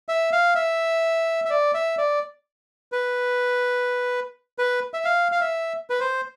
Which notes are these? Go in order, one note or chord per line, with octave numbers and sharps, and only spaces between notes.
E5
F5
E5
E5
D5
E5
D5
B4
B4
E5
F5
F5
E5
B4
C5